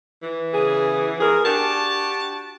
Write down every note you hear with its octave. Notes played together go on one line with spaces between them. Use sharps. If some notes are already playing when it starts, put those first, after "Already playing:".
E3
C#3 B3 G#4
E2 G#4 A#4
D4 F#4 G4 A5